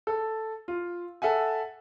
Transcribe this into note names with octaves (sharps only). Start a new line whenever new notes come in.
A4
F4
A4 E5 F#5 G#5